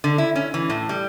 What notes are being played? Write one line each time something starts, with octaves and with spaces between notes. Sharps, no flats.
D3
E4
C#4
E3
A2
G3